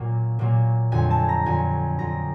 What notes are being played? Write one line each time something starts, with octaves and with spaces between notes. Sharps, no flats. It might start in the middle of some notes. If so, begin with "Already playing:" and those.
Already playing: A#2 F#3 A#3
A#2 F#3 A#3
F2 D3 F#3 G#5
A5
A#5
F2 D3 F#3 G#5
F2 D3 F#3 A#5